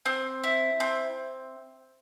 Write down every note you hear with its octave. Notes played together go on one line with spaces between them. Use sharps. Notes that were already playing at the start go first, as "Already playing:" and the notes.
C4
E4
C4